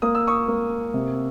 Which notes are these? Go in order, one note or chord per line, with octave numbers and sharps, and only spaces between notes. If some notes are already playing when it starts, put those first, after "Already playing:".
A#3 D#6
E6
C#6 D#6
A#3
C3